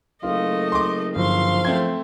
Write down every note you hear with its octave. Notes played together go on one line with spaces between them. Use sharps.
F#1 A3 F4 D#5
C6 D6
G1 F3 F5 C6
A3 C4 G#6